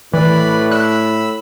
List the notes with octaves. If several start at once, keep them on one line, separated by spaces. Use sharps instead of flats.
A2 E3 B4 D5 B5
B5 E6 F#6